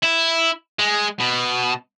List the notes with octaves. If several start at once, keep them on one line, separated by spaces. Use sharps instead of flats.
E4
G#3
B2